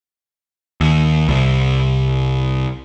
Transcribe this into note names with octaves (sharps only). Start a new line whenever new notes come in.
D#2
C2